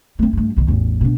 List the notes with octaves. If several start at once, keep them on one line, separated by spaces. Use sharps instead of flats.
A3 C4
G2 A3
B1 D#3
A1 E2
B2 D4